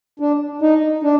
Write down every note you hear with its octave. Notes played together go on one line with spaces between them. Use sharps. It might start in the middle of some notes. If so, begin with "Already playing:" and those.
D4
D#4
D4